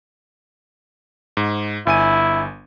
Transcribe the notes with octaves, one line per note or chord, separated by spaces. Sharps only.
G#2
G1 E4 G#5 D#7